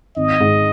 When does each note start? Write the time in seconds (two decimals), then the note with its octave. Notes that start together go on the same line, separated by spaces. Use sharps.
0.16 G#1 D#5
0.41 G#2